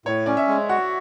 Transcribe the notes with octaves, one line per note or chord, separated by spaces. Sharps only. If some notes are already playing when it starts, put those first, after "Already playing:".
A2 C#5
C#4 D5
E5
G#3
F#4 F#5